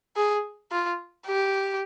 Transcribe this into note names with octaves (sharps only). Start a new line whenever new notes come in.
G#4
F4
G4